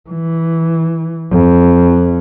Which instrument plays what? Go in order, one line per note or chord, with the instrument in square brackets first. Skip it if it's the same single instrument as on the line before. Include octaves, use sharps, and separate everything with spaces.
[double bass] E3
F2